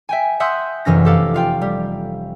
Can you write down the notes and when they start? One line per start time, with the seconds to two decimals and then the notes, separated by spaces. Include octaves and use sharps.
0.09 E5 G5 G#5
0.40 E5 F#5 C6 D#6 E6 G6
0.85 F1 F#2 E3 C#4 A#6
1.05 G4 A4 F5
1.34 F4 F5 G5
1.61 G3